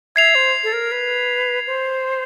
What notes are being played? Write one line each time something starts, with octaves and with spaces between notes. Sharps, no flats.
E5 G#6 C7 F7
C5
A4
A#4
B4
C5